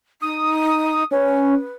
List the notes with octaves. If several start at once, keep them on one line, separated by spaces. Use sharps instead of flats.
D#4 D#6
C#4 B4